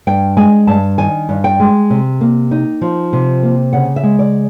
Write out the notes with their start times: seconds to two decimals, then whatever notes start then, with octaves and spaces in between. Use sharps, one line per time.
0.07 G2 G5
0.37 G#3 G#5
0.67 G2 A5
0.98 D#3 G#5
1.29 G2
1.44 G5
1.60 G#3
1.90 C3
2.21 A#3
2.51 D#4
2.81 F3
3.13 C3
3.43 A#3
3.73 C#3 F#5
3.96 E5
4.03 G#3
4.19 D5